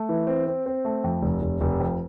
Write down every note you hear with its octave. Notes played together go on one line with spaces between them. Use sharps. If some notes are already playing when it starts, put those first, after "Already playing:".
Already playing: A3
E3
C4
C4
C4
A3
F2
F1
F1
F1
F2